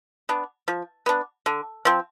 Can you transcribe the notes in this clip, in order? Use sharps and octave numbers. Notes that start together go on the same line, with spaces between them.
B3 D4
F3
B3 D4
D3
F3 C4